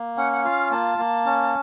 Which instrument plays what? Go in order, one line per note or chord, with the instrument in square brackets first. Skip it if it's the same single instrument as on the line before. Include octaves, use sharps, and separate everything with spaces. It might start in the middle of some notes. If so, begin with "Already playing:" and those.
Already playing: [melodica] A#3
[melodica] C#4 [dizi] F#5
[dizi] F#5
[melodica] F4 [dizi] F5
[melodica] A#3 [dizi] A5
[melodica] A#3
C#4